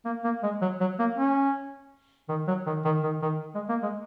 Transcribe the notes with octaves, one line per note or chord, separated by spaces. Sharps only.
A#3
A#3
G#3
F#3
F#3
A#3
C#4
D#3
F#3
D#3
D#3
D#3
D#3
G#3
A#3
G#3